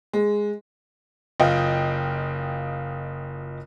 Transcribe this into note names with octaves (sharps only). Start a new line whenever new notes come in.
G#3
F#1 F4 D#5 G5